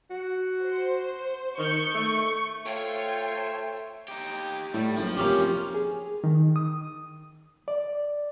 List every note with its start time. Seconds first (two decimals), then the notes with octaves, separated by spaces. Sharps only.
0.10 F#4
0.63 C5
1.58 D#3 C#6 G6 C#7
1.94 A3 C#6
2.66 A3 F4 C5 C#5 G5
4.08 D#4 G4
4.74 A2 G3
4.97 F#1 F3
5.17 F1 A#3 C#4 G4
5.74 G#4
6.24 D#3
6.56 D#6
7.68 D5